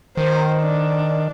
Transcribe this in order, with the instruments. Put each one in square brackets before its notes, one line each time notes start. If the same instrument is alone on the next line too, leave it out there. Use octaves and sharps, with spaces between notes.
[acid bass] D#3 [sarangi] C5
[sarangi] D4